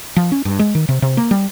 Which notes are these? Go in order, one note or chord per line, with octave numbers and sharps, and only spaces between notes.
F3
C#4
G2
G#3
D#3
C3
C3
A#3
G3